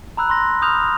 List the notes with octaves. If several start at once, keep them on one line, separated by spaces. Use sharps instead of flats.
A#5 B5 E6 F#6
C6 A#6
B5 D#6 F6 G6 F7